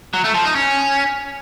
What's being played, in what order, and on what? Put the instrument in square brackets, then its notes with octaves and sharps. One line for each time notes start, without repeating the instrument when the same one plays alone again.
[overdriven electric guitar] F#3
A3
F3
D#4
C#4